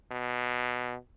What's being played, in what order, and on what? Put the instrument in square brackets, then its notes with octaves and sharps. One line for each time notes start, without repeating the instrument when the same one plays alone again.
[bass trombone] B2